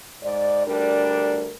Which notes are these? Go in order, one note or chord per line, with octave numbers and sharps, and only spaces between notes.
G#2 D5
D2 G3 D4 A#4